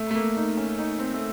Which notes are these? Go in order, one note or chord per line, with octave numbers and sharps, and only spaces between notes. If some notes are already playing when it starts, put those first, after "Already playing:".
Already playing: A3
A3
A#3
D#4
C#4
D#4
C4
A3